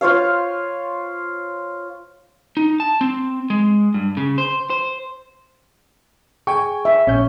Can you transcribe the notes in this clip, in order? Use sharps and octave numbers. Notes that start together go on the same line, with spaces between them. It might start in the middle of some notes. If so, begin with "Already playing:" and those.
F4 C5 C#5 F5
D#4
A5
C4
G#3
G2
C#3
C5
C5
G#4 G5 G#5 C#6
E5
A#1 C#4 G6